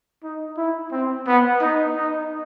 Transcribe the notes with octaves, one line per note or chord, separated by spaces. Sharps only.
D#4
E4
C4
B3
D#4
D#4